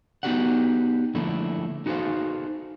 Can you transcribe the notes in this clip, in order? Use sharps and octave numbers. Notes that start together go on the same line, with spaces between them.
B3 D#4 F#4 G4 D5 F#5
D3 F3 A3 A#3 E4
D#4 F#4 G#4 A4 C5 F5